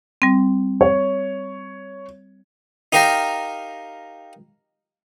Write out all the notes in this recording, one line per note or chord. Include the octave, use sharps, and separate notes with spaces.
G3 C4
C#5
D#4 G4 A#4 F5 G5 A#5